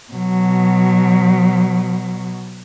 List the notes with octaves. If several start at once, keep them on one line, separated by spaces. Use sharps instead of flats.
B2 F#3